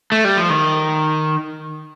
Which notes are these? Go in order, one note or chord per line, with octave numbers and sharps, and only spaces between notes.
A3
G3
F3
D#3